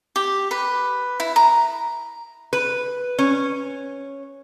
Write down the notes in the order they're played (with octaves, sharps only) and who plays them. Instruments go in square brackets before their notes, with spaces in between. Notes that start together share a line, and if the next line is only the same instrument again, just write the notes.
[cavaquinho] G4
B4
E4
A#5
[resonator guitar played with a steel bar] B4
C#4